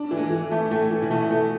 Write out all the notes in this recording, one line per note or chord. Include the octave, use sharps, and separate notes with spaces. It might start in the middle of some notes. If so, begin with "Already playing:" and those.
Already playing: D4
E3 A3
G#3
E3
A3
A2 A3
E3
C#3
B2 A3
A3